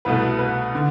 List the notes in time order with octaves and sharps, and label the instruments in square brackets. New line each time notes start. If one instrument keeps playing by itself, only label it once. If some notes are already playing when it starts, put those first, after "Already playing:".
[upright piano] C2 B2 A3 B4
B4
D3